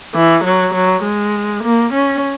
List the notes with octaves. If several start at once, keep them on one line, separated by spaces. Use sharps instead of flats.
E3
F#3
F#3
G#3
A#3
C#4